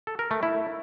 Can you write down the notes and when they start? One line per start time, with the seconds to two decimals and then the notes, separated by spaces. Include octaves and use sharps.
0.07 A4
0.19 A#4
0.31 A3
0.43 E4